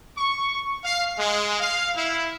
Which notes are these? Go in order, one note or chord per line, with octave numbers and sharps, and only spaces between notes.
C#6
F5
G#3
F5
E4